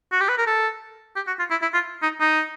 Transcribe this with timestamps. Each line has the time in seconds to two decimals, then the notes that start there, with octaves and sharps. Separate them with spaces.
0.12 F#4
0.21 G4
0.29 B4
0.38 A#4
0.47 A4
1.16 G4
1.27 F#4
1.39 F4
1.51 E4
1.62 E4
1.74 F4
2.03 D#4
2.20 D#4